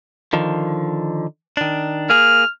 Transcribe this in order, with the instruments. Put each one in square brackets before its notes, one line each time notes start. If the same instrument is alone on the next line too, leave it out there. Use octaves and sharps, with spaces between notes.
[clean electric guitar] D3 D#3 F3
D#3 D4
[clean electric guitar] A#3 G#4 [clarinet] F6